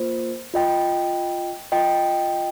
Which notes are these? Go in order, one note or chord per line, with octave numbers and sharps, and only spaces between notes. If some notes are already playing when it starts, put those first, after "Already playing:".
Already playing: A#3 F4 C5
F4 D#5 G5
F4 D#5 G5